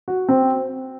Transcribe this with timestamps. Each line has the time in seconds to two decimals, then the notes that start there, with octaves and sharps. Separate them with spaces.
0.08 F#4
0.29 C4